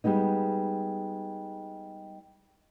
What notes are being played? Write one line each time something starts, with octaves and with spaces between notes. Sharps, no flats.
G3 G#3 B3 D#4